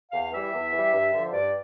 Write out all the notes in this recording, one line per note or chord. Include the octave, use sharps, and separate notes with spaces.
E2 F5
E3 G3 E5
E2
E3 G3
G2
D3 F3
G2 D5